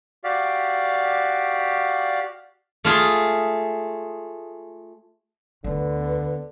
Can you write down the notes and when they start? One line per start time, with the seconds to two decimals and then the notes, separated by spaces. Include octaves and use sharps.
0.24 F#4 G4 D5 F5
2.85 A3 F4 G#4
5.64 D2 D3 B3